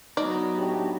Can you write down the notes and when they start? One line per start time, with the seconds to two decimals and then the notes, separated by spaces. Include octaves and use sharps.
0.17 F#3 B3 D#4 D5
0.57 A2 D4 G4